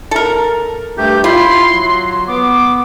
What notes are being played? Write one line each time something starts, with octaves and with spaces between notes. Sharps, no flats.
A4 A#4
G2 A3 G4 G6
E4 F4 B5 C6
F#3
B3 D6